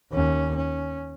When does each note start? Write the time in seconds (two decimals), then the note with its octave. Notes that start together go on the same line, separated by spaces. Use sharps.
0.11 D#2 C#4
0.56 C#4